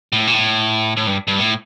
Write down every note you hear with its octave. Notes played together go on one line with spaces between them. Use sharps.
A2
A#2
A2
A2
G2
G2
A2